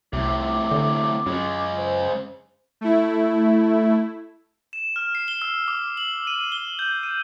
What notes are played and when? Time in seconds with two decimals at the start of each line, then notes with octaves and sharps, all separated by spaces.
0.13 C2 A2 C3 D6
0.71 D3
1.26 F#2 C#3 G#3
1.77 C5
2.81 A3 E4
4.73 E7
4.96 F6
5.15 C7
5.28 G7
5.42 E6
5.68 D6
5.97 F#7
6.27 D#7
6.52 G7
6.79 G6
7.03 D#7